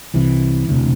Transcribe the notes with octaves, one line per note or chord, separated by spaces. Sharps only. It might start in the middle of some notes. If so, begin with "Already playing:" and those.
C2 C3 E3
E1 D2 C3